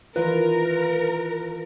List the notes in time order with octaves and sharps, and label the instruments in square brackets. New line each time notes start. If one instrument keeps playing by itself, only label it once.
[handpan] D#3 E3 F4 [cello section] A#4 [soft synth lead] B4